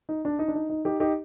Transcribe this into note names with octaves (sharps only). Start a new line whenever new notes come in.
D#4
D4
D#4
D4
D#4
D#4
D#4 G4
D#4 G4